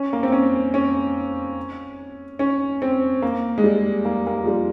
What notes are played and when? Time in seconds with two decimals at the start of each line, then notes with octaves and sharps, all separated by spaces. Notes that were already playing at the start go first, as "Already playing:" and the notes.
Already playing: C#4
0.13 A#3
0.23 C4
0.32 C#4
0.74 C#4
2.39 C#4
2.82 C4
3.22 A#3
3.58 G#3
3.64 G3
4.05 A#3
4.27 A#3
4.43 F3
4.47 G3